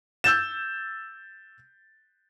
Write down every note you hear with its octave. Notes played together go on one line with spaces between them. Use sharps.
E6 G6 A6 E7